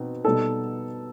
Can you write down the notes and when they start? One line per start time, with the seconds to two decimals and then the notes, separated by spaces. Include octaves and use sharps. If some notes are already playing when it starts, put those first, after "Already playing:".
Already playing: B2 C4 D#4
0.24 B2 G3 B3 D#4 A4